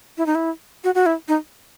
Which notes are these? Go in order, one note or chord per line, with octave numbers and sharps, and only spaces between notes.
E4
D#4
E4
F#4
F#4
E4
D#4